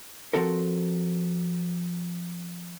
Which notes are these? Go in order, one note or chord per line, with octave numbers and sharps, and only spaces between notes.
F3 F#3 C4 F#4 A4 A#4